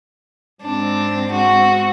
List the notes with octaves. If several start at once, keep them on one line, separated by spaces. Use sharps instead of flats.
G#2 C4 D4
F#4